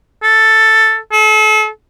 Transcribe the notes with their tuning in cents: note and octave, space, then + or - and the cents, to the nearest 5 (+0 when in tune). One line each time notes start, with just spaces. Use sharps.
A4 +5
A4 -35